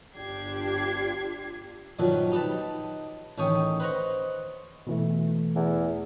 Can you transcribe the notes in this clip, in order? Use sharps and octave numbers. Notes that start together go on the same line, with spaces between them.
G1 D4 F4 G4 G#6 C7
G2 A#2 D#3 F3 F#3
D#4 G4 B4 A5
A1 D#3 C#4 G5 C#6 D#6
B4 C5 D#5 F#5 A#5 C#6
B2 E3 A3
E2